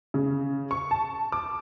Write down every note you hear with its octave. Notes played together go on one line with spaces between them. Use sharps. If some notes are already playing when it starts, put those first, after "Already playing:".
C#3
C#6
A5
D6